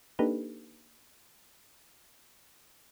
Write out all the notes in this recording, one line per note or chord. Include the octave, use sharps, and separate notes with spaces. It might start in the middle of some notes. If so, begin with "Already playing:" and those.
A#3 D4 D#4 G4 A4 B4